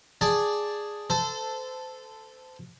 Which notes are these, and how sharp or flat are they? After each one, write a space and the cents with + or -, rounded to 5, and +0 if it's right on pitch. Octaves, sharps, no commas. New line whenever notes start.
G#4 +0 D5 +0 A5 +0
A4 +0 C5 -30